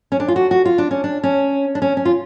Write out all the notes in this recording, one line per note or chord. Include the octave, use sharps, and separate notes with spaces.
C#4
D4
F4
F#4
F#4
F4
D4
C#4
D4
C#4
D4
C#4
C#4
F4